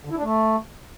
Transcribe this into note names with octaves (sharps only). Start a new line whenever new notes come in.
D3
E4
D4
A3